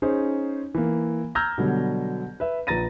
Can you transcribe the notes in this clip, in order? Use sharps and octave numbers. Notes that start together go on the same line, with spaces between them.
C#4 D#4 G#4 C5
E3 A#3
A#5 E6 F6 G6 G#6 A#6
B2 D3 F#3 G3
B4 E5
A#1 B4 A#5 A6 A#6 D#7